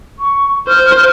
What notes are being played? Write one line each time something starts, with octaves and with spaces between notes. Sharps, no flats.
C#6
C5 F6